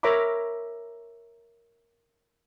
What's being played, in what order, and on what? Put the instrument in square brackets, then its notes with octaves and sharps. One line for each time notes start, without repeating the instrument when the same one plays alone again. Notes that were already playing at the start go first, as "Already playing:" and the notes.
[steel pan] A#4 C#5 E5 A#5 B5 D6